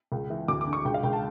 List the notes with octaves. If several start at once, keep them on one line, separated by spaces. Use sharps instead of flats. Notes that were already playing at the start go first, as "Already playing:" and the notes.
C#2
E3
D2 D6
D6
D3
C#6
C#2 G5
F5
C#2 G5
A5